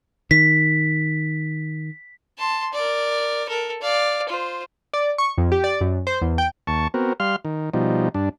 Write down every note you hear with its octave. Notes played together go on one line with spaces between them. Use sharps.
D#3 B6
A5 C6
A#4 D5
A4 A#4
D5 F5
F4 C5
D5
C#6
F2
G4
D5
F#2
C5
E2
G5
D#2 A5 C#6
B3 C4 F#4 A#4
G3 F5 C6 F6
D#3
B2 F3 G3 D#4
G2 D4